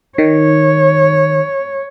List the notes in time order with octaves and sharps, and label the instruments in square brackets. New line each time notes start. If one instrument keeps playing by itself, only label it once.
[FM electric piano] D#3 [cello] C#5